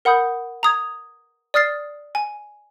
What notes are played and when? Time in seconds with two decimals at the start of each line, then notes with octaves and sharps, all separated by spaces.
0.05 A#4 F#5 B5 D#6 G6
0.63 A#5 D#6 G#6
1.54 D5 D#6 F6 A6 C7
2.15 G#5